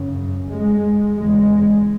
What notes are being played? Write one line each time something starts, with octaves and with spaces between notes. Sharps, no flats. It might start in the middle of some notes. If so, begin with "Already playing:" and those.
Already playing: F#2 C#3
G#3
E2 C#3 G#3